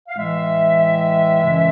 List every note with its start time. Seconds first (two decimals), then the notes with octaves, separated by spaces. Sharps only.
0.09 F5
0.17 A2 E3 G#3 E5
1.42 F#2 C#3 E3 G#3